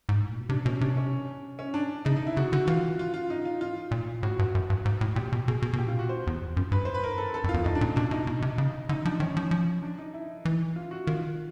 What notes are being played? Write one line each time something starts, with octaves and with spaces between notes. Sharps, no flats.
G#2
A2
A#2
B2
C3 D4
B2 C#4
C3 D4
C#4
C#4
D4
C#3 D#4
D#4
E4
C#3 F#4
D3 F#4
E3 F4
F4
F4
D#4
F4
F4
A#2
A2 F#4
G2 F#4
F#2
G2
G#2
A2
A#2 G4
B2
B2 G#4
B2
B2
A#2 G4
F4
F#4
C5
E2
F2
F#2
G2 B4
C5
B4
A#4
A4
A4
F2
F4
E2
F2 D#4
D4
A#2
B2 D4
B2 D#4
B2
C3
C#3
D3 D#4
F3 D4
D#3 C#4
F3
F3
D4
D#4
E4
E3
F4
F#4
D#3 F4